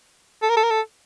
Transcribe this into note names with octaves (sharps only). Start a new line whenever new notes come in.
A4
A#4
A4
A#4
A4